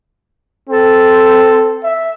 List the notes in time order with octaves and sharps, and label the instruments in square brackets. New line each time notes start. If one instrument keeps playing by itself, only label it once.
[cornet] C4 [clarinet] A4
[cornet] E5